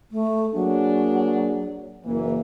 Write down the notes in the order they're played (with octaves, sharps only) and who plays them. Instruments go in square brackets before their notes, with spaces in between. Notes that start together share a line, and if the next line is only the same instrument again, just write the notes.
[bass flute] A3
[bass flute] F#3 [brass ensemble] A#3 D4 G#4
[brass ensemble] F#1 E3 [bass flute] A#3